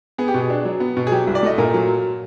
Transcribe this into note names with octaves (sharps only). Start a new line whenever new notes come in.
B3 G#4
G4
B2 G#4
D4
F#3
B3
B2
G#4
F#3 G4
C2
D5
A3 D#5
A#2 A#4
F#3